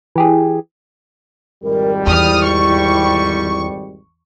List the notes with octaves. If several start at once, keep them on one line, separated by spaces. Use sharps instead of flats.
E3 G4 G#4
G#1 F2 G3 A#4
E2 E4 D#6 F6
C#6